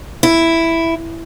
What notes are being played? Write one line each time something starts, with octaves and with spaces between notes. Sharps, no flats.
E4